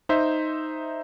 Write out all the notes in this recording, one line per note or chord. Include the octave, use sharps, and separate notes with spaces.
D#4 C5 E5